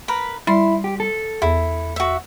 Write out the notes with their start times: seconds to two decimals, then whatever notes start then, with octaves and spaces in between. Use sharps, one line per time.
0.08 A#4 B4 B5
0.47 G3 E4 C6
0.84 G4
1.00 A4
1.42 E2 E4
1.96 F#4 E5